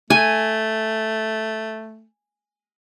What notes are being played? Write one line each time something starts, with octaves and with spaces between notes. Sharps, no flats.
A3 G#5